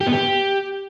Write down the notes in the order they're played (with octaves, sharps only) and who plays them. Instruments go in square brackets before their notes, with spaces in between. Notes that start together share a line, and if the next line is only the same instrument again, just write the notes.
[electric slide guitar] G4
B3
G4